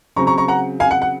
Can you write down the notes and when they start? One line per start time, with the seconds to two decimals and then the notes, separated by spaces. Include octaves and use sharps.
0.16 C#3 F#3 C4 A#5 C#6
0.27 A#5 C#6
0.38 A#5 C#6
0.48 F#5 A#5
0.80 F5 G#5
0.91 F#5
1.02 F#5